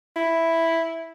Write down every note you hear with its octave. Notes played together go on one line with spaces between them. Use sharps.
E4